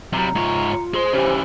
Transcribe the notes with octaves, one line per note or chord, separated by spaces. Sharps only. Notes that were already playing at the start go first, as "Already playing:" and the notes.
C3 F#3 G3 A#5
G#2 F4 C#5
G#4 C5 C6
C#3 E3 G4